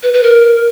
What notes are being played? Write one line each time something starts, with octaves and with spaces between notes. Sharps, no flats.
B4
B4
A#4